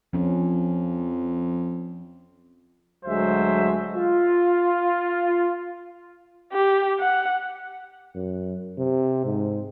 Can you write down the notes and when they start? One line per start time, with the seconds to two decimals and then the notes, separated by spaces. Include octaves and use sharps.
0.13 F2 F3 C#4
3.05 D2 F#3 G#3 C5 E5
3.94 F4
6.53 G4
7.00 F#5
8.15 F#2
8.78 C3
9.25 G#2